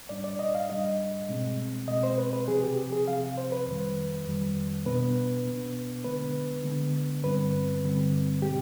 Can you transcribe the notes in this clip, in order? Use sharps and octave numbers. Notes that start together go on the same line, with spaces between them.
G#2 G3 D4 D5
D5
D#5
F5
G#2 G3 D4 D#5
B2 G#3 C4
B2 G#3 C4 D#5
C5
B4
B4
C3 F3 C4 G#4
G4
G#4
C3 F3 C4 F5
C5
B4
F2 D#3 G3
F2 D#3 G3
B2 B3 D4 B4
B2 B3 D4
D3 G#3 B3 D4 B4
D3 G#3 B3 D4
G2 D3 G3 C4 B4
G2 D3 G3 C4
B2 G#3 C4 G4